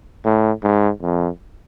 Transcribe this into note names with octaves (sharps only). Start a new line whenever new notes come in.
A2
G#2
F2